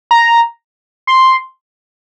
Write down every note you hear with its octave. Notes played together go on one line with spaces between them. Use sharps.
A#5
C6